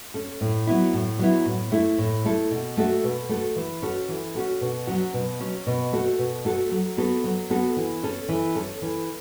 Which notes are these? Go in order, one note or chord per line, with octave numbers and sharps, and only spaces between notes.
C#4 A4
A2
F#3 B3 E4
A2
F#3 B3 E4
A2
A3 E4 A4
A2
A3 E4 A4
B2
A3 F#4 A4
B2
A3 F#4 A4
E3
C#4 F#4 A4
E3
C#4 F#4 A4
B2
F#3 C#4 F#4
B2
F#3 C#4 F#4
B2
A3 F#4 A4
B2
A3 F#4 A4
F#3
B3 F#4 A4
F#3
B3 F#4 A4
E3
C#4 A4
E3
C#4 A4
E3